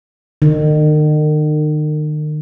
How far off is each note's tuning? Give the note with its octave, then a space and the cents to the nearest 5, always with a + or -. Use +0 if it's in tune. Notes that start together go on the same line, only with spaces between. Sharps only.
D#3 -40